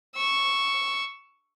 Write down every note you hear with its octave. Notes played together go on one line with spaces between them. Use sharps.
C#6 E6